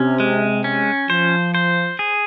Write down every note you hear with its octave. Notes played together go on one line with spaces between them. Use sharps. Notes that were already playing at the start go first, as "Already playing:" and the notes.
Already playing: C3 C#4
G#3
C#4
F3 C5
C5
G#4